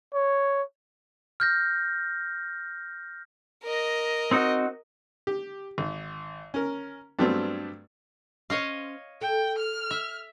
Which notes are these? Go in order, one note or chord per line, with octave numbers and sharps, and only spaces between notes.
C#5
F6 G6 A#6
A#4 D#5
C4 D#4 F#4
G4
G#1
C#4 A#4
G2 F#3 A3 B3 C4 D4
C#4 C5 C#5 D#5 F5
A4 G5
F6
E5